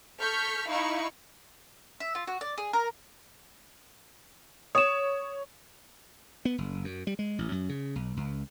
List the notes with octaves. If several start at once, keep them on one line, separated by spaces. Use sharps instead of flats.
A4 C#6 F6 G6 B6
D#4 E4 F5 B5 C#6
E5
F4
F#4
D5
G#4
A#4
C#5 D#6 E7
B3
F#1
F#2
G3
G#3
A1
F#2
C#3
B1
C#2